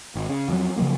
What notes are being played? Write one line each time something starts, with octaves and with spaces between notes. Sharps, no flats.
G#1
C#3
F2 F#3
C#3 F3 F#3 A#3